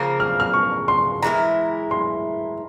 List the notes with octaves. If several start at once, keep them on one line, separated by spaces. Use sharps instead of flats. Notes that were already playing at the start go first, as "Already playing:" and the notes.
Already playing: C#3 F3 A#3
F6
F6
C#6
C6
E3 G#3 E4 A#4 A#5
C6